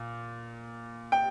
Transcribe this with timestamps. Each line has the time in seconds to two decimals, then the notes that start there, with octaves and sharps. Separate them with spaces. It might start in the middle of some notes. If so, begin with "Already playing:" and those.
Already playing: A#2
1.12 G5